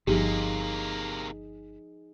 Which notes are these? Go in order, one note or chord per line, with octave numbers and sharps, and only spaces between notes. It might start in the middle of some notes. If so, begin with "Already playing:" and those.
G1 C3 F3 A#3 D#4 G4 G#4